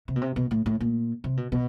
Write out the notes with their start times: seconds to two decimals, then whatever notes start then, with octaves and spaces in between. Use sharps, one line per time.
0.08 C3
0.16 B2
0.22 C3
0.36 B2
0.51 A2
0.66 A2
0.80 A#2
1.24 C3
1.37 B2
1.52 B2